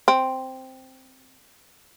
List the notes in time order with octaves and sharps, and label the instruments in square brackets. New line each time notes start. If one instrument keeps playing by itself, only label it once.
[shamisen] C4